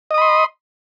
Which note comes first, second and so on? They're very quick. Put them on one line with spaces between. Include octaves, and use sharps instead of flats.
D#5 D#6 B5 C6